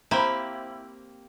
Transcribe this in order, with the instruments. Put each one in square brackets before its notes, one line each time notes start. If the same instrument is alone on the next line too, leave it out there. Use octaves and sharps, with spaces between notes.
[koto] A#3 C4 G4 [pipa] E4 [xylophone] C5 A#5